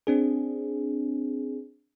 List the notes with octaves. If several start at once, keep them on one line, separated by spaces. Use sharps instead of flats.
C4 D4 G#4